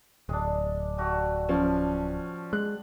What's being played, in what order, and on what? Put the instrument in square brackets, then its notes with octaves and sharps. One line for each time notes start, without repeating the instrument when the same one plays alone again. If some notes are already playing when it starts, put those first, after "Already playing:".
[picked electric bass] D1 [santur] G#3 D4
[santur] G3 A3 F#4
[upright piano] F3 C#4
[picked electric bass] G#3 [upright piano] F#6